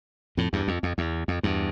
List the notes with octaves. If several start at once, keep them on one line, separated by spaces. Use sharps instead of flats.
F2 A2
E2 G2
F2
F2
E2
F2
E2 G2